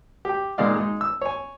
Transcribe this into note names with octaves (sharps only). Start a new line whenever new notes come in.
G4 G5
A#2 D#3 G#3 D5 D#5 F5
G#3 D#4
E6
C#5 G#5